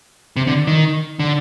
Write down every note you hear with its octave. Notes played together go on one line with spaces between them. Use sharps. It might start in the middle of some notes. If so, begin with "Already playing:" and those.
C3
D3
D#3
D3